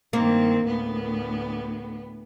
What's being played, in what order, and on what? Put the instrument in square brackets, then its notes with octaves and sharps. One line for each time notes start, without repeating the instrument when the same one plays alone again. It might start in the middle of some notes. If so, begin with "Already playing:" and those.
[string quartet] G2 D#3 C4 [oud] A#3
[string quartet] D2 A2 B3